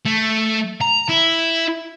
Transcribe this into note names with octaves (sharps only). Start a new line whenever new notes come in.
A3
A#5
E4